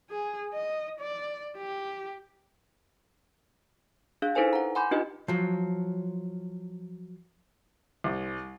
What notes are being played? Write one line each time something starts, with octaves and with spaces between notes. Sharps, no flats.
G#4
D#5
D5
G4
D4 G#4 F5 F#6
D#4 E4 A4 B4 C5 G#5
F#5 A#5
F#5 G#5 B5 C6 D6 G6
D4 D#4 F4 G4 B4 D#5
F3 F#3
C2